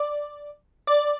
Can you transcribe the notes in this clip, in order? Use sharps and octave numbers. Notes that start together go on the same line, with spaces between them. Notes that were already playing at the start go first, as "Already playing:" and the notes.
Already playing: D5
D5